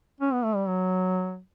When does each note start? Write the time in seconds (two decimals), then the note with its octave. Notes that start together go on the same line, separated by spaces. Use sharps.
0.21 C#4
0.33 B3
0.44 A3
0.55 G3
0.68 F#3